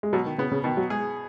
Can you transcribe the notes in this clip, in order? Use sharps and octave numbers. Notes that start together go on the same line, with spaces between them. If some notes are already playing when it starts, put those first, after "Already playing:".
G#3
B2 F#3
D#3
C#3 B3
C#3
B2 D#3
F#3
G#3 G#4